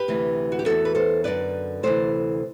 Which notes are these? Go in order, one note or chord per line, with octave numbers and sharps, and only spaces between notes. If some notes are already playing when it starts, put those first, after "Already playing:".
Already playing: G4 B4
D2 C3 E3
F#4
G4
E2 C3 E3 F#4 A4
B4
A4 C5
F#2 D3 B4 D5
D2 C3 E3 A4 C5